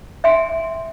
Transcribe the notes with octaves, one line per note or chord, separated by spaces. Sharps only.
E5 G5 G#5 C6